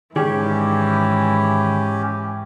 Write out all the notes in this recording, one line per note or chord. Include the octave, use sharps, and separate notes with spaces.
G#2 D#3 E3 C#4 G4 G#4 D5